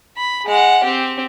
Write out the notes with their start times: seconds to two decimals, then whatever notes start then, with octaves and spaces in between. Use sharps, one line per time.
0.17 B5
0.46 G#3 F#5
0.85 C4 G4